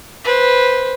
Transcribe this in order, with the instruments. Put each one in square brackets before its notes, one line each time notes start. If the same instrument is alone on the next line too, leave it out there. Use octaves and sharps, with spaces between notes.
[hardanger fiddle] B4 C5